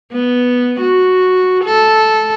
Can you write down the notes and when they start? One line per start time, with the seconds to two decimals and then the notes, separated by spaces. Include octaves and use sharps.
0.12 B3
0.81 F#4
1.64 A4